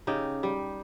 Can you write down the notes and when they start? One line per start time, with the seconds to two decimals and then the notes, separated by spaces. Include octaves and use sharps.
0.07 C#3 D#4 G4
0.43 G3